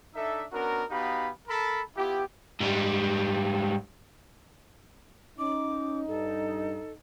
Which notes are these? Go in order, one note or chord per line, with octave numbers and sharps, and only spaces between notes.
D4 D#4 A4 E5
B3 C#4 D4 F#4 A#4
B3 D#4 F#4 G4 F5 B5
A4 A#4 A5 B5
B3 E4 F4 G4
G#2 G3
C#4 D#4 D6
G2 A4